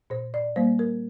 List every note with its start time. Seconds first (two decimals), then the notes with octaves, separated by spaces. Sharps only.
0.10 A#2 C5
0.34 D5
0.56 G3 A#3 C5
0.79 A#4